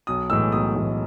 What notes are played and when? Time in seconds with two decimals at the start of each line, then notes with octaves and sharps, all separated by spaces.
0.07 B1 D#6
0.30 A2 E3 G#3 E6
0.52 B1 D#6
0.76 A2 E3 G#3